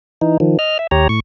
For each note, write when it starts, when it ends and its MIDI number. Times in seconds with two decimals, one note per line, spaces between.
0.21 0.37 52
0.21 0.37 63
0.40 0.57 51
0.40 0.57 53
0.59 0.78 75
0.59 0.78 89
0.79 0.87 76
0.91 1.08 39
0.91 1.08 67
0.91 1.08 73
0.91 1.08 82
1.09 1.20 45
1.09 1.20 85